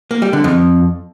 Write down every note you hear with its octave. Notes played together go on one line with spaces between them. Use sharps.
A#3
G3
D3
F2